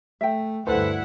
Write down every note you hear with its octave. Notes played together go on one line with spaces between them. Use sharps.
A3 E5 G5
D2 G2 E4 A4 B4 C5 F#5